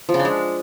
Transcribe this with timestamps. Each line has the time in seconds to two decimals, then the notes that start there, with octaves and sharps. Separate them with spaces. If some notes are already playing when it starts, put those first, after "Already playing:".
0.09 F3
0.14 C#3
0.19 D4
0.25 G#3